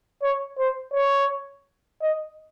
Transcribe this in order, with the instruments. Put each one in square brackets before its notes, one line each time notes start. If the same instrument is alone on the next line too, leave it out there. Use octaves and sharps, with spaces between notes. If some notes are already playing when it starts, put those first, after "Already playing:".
[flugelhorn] C#5
C5
C#5
D#5